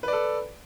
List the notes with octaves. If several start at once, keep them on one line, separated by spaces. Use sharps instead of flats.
A4 B4 D5